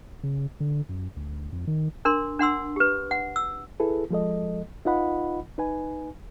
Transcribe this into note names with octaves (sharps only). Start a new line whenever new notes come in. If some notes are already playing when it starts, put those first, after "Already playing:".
C#3
D3
F#2
D2
F2
D#3
D4 A#4 C6
D4 F#5 C6 E6
G4 B4
F#5
E6
E4 G#4 A4 B4
F3 G#3 A4 D#5
D#4 F4 B4 D#5 F#5 B5
D#4 B4 G#5